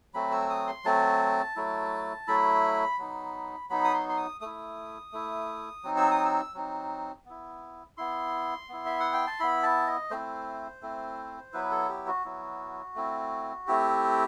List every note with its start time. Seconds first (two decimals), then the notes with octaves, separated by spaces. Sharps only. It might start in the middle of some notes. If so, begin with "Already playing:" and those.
0.14 F#3 A3 C4 B5
0.32 E6
0.49 D#6
0.67 C6
0.84 F#3 A3 C4 A5
1.56 F#3 A3 E4
2.28 F#3 A3 E4 B5
2.98 F#3 B3 D#4
3.69 F#3 B3 D#4 B5
3.84 D#6
3.94 C6
4.09 C6
4.17 D#6
4.41 A3 E4 D#6
5.12 A3 E4
5.83 F#3 C4 D#4
5.97 E6
6.11 D#6
6.25 E6
6.54 F#3 C4 D#4
7.25 B3 E4
7.97 B3 E4 C6
8.69 B3 E4
8.86 E5
9.00 F#5
9.13 G5
9.27 A5
9.40 B3 E4 B5
9.63 A5
9.87 D#5
10.10 A3 C4 E4 C5
10.82 A3 C4 E4
11.53 F#3 B3 E4 B4
11.71 A4
11.89 G4
12.07 F#4
12.25 F#3 B3 E4
12.95 A3 C4 E4
13.67 A3 C4 E4 G4